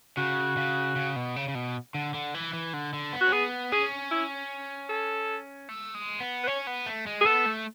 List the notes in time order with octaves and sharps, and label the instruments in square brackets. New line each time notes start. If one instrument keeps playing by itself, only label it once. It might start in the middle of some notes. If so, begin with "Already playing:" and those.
[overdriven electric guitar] C#3 [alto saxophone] F#4
[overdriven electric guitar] C#3
C#3
B2
C#3
C#3
B2
D3
D3
E3
E3
D3
D3
B3
[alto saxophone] F#4
[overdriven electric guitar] C#4
[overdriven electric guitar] B3 [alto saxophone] G#4
[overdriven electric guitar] C#4 [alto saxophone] G#4
[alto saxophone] E4
A4
[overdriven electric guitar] A3
G#3
B3
[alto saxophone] B4
[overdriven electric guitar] C#4 [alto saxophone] C#5
[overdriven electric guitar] B3
A3
G#3
[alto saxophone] G#4
[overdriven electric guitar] B3 [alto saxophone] A4
[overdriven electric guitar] A3